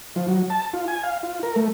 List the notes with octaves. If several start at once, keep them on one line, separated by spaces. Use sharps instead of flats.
F3
F#3
A5
F4
G#5
F5
F4
A#4
A3